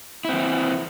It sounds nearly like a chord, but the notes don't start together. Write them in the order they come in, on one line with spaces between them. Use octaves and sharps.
E4 C4 E3